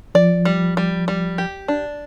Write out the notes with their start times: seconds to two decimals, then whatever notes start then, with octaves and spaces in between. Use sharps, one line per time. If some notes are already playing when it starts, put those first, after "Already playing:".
0.15 F3 D5
0.45 G3
0.77 G3
1.08 G3
1.38 G4
1.68 D4